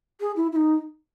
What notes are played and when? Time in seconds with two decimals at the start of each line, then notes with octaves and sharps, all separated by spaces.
0.20 G#4
0.36 E4
0.52 E4
0.56 D#4